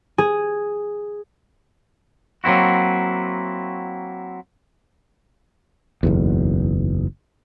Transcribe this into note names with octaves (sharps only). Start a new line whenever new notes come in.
G#4
F#3 A#3 C4 E4 F#4
F#1 B1 E2